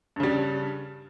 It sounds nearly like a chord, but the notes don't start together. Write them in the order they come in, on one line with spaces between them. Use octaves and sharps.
G2 C#3 G3